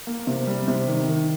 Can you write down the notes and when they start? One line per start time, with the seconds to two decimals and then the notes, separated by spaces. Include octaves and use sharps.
0.07 A#3
0.27 C3
0.47 G3
0.68 C3
0.87 D#3
1.08 D#3